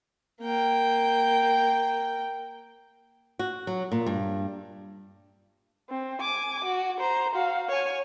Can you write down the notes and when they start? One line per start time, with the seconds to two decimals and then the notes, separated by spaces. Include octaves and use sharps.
0.41 A#3 G5
3.39 F#4
3.67 F#3
3.92 A#2
4.06 G2
5.90 C4
6.21 G#5 D6
6.65 F#4
7.00 C5 A#5
7.35 F#4 F5
7.69 C#5 G#5